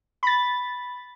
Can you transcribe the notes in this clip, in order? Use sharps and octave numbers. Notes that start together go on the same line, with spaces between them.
B5 A6